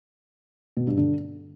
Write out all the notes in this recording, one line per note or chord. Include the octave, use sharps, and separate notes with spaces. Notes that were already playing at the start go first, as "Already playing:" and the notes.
B2
G2
D3